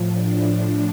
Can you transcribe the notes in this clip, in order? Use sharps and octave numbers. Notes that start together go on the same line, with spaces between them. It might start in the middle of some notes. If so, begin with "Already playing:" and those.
Already playing: A2 F3
D4